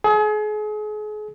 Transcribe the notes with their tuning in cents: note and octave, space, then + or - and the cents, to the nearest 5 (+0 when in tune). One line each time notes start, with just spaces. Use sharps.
G#4 +35